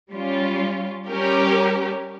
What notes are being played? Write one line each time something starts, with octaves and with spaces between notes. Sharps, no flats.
G3 C#4 F4
G3 C#4 G4 A#4